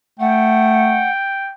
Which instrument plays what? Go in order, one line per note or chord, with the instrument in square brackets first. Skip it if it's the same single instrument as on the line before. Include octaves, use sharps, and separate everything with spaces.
[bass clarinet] A3 [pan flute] F#5 [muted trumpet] G5